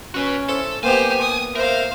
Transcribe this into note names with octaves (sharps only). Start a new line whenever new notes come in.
C#4 F#4 B4
E4 A4 C5
A#3 B3 G4 C5 G5 G#5
D#6
A#4 C5 E5 F5